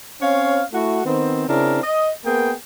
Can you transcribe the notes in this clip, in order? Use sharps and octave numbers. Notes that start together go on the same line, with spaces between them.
C4 C#4 C#5 F5
A3 E4 F#4
D#3 B3 C4
C#3 C4 D4 E4 A#4
D#5
A#3 B3 G#4 A#4 G5